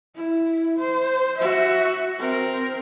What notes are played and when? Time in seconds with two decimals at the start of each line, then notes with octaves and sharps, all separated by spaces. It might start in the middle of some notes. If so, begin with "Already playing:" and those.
0.16 E4
0.79 C5
1.39 F#4 E5
2.19 C4 A#4